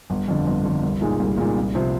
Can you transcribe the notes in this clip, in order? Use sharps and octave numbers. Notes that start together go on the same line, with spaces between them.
G1
F2 D3
G1
F2 D3
C2
A#2 G#3 D#4
C2
A#2 G#3 D#4
C2
C3 F3 C4